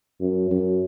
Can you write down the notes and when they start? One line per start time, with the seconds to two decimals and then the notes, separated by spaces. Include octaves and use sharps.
0.21 F#2
0.51 F#2